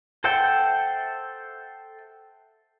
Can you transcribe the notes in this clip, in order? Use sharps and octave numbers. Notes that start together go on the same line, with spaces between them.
A4 C5 E5 F#5 G5